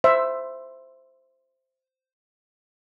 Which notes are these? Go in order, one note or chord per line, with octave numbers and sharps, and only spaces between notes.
C5 E5